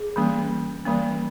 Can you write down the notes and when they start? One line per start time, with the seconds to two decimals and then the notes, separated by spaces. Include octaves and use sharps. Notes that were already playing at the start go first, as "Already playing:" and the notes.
Already playing: G#4
0.16 E3 G3 A#3 C#4
0.85 E3 G3 A#3 C#4